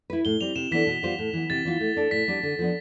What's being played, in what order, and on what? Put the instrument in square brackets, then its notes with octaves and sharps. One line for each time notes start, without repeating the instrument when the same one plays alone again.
[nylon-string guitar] E4 B4
[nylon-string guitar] A2 [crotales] G7
[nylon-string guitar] G3 C4 [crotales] F7
[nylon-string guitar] C3 [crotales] E7
[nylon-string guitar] E3 B3 D4 A4 [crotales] B6
[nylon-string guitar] B2
G3 B3 F4 C5
A2
E3 B3
[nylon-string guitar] C3 [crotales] A6
[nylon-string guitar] E3 B3 F4
A3
D4 A4
[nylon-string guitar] A2 [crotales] B6
[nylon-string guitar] G3 B3 D4
D3
F3 B3 D4